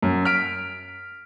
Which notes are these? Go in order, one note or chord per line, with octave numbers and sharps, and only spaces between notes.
F#2
F6 B6 D7